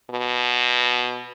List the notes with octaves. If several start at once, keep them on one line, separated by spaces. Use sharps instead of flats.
B2